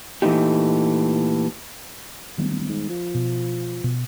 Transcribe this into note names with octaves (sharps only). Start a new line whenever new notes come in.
A#2 E3 A3 C4 D#4 G4
D1 D#3 G3 B3
G#2
F3
B2
B2